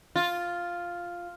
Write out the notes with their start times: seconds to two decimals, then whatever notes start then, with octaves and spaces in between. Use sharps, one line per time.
0.16 F4